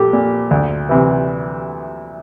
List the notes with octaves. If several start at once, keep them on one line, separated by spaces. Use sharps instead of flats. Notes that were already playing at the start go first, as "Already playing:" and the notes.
Already playing: A#1 G4 A4
A#2
D2
C3 E3